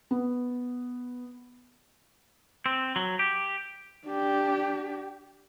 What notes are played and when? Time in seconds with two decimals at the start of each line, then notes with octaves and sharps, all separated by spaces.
0.11 B3
2.66 C4
2.96 F#3
3.19 G4
4.06 D4 G4